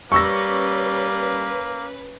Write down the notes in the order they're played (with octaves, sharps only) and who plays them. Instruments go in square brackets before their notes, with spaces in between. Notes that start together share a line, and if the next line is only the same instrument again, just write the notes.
[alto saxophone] G3 [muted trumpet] A#3 [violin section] C#4 B4 [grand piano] C#6 E6 A#6